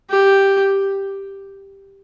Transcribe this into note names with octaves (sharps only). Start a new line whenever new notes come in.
G4